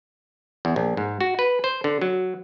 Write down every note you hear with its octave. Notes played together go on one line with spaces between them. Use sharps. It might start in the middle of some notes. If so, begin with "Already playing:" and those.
E2
A#1
G#2
F#4
B4
C5
D3
F#3